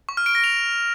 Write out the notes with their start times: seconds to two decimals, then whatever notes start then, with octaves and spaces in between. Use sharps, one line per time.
0.09 C#6
0.17 F6
0.26 D7
0.35 A#6
0.44 F7